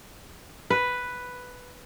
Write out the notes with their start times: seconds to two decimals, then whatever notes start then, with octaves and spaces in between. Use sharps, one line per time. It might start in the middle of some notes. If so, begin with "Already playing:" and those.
0.70 B4